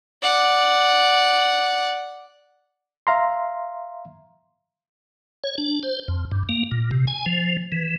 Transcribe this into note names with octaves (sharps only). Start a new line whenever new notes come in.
D5 F#5
E5 F5 A#5 C6
C#5
D4
C5
F2
G2
A#3
A#2
C3
G#5
F3
E3